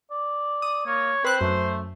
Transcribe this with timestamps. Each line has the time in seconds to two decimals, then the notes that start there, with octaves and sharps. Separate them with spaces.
0.11 D5
0.62 D#6
0.86 A#3 C#5
1.25 C4 B4 C5 F#6
1.41 F#2 A3